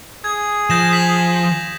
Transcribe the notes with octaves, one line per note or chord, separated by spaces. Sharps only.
G#4 G#6
F3 G6 A#6 E7
D#6 B6 F#7